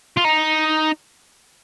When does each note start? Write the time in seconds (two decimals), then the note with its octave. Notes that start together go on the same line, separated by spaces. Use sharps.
0.17 F4
0.24 D#4